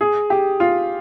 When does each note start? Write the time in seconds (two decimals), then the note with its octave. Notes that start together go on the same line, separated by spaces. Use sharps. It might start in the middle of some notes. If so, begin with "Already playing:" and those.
0.01 G#4
0.30 G4
0.60 F4